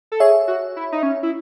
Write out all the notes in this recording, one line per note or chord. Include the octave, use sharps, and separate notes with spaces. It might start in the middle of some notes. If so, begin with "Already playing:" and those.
A4
G#4 C#5 E5
F#4
E4
D#4
C#4
E4